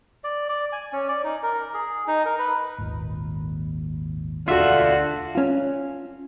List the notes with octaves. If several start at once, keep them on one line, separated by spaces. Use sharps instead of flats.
D5
D5
G#5
C#4
D5
D#4
A#4
G#4
D#4
A#4
B4
G#1 D#2 A#2
E1 D2 D3 F4 F#4 E5
C#4 F4